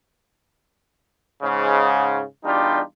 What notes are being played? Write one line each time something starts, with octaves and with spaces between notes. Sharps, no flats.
G#2 C#3
E2 G3 D4 D#4 F4 G4